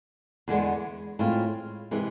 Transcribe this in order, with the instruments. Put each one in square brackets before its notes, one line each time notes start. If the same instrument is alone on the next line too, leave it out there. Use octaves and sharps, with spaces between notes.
[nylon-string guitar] E2 D3 G#3 B3
A2 G#3 C4 F4
C3 E3 G#3